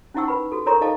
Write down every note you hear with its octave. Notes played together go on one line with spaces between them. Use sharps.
C#4 D#4 E4 F#5 C#6 E6
B4 B5
F#4 A4
A4 A#4 C#5 A#5 C6 C#6
D#4 A4 D#5 F5 A5 D6